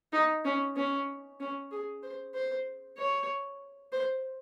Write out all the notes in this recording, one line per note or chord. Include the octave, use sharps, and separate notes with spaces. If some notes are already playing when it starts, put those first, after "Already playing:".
D#4
C#4
C#4
C#4
G#4
C5
C5
C#5
C5